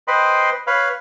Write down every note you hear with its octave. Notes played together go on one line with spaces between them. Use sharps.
B4 C5 D#5 G5 B5 C6
B4 C#5 F5 B5